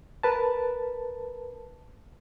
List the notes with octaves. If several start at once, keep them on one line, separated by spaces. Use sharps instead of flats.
A#4 B4 A5